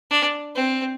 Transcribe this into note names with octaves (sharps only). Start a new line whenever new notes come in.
D4
C4